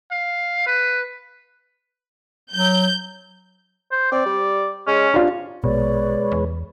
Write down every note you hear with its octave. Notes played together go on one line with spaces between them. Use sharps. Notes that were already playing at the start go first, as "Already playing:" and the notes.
F5
B4
F#3 G6
C5
C4 D5
G3
G#3 C#4
C3 D4 F4
A#1 B2 G#3 B4 C#5 D5
E2